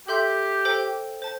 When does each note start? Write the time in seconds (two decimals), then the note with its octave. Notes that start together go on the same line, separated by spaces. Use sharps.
0.08 G4 A4 E5 C6 G6
0.65 A4 C5 G5
1.22 C5 A5